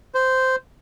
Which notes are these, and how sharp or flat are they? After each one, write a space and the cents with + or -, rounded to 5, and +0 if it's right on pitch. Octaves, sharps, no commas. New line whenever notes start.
C5 -10